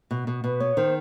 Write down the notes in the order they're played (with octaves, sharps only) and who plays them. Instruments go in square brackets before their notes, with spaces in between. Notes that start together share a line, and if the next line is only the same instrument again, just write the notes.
[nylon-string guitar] B2
B2
[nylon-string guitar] B2 [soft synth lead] B4
[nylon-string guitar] B3 [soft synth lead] C#5
[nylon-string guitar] D#3 [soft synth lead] C5